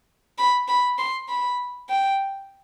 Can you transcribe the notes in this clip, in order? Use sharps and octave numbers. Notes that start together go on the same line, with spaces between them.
B5
B5
C6
B5
G5